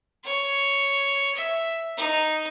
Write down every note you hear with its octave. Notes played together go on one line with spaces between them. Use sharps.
C#5
E5
D#4